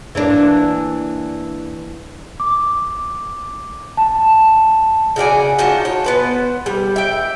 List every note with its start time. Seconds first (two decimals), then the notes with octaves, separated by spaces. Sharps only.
0.15 E3 A#3 D4
2.40 D6
3.97 A5
5.16 C#3 F#4 D5 G#5
5.59 D#4 F4 F#4 A5
5.85 C#5
6.04 B3 B4 C5
6.66 G3
6.96 E5 G5